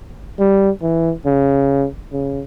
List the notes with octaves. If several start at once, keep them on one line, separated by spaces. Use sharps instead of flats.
G3
E3
C#3
C#3